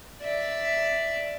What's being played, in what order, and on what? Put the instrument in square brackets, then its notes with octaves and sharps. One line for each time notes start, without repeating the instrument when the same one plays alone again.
[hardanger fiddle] D5 E5